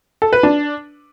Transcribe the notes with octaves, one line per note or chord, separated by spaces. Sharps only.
A4
B4
D4